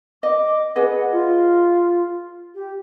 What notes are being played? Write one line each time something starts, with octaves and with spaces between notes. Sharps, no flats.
D#5 D6
G#4 B4 D#5 F#5
F4
G4